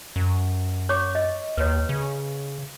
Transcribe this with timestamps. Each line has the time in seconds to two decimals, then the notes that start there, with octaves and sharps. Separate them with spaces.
0.16 F#2
0.89 C#5 C#6 D6
1.15 D#5
1.57 D#2 B4 C#5
1.89 C#3